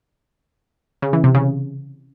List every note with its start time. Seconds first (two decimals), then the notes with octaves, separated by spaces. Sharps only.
1.02 C#3
1.13 E3
1.24 C3
1.35 C#3